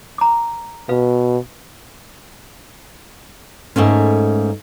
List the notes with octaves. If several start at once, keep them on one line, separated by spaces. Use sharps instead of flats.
A#5 D6
B2 B4 F5
G#2 A3 A#3 C#4